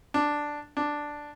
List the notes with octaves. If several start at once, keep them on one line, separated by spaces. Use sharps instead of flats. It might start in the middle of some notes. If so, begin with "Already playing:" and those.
D4
D4